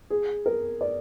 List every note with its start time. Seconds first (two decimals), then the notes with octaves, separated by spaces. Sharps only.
0.10 G#4
0.46 A#4
0.81 D5